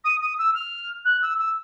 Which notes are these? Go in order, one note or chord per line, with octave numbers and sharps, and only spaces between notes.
D#6
D#6
E6
F6
F#6
E6
E6